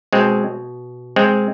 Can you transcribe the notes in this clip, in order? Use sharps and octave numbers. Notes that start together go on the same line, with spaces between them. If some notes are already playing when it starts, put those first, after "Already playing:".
B2 G#3 C4
G#3 C4